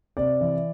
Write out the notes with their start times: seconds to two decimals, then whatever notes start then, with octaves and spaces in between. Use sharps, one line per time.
0.17 C3 D5
0.41 E3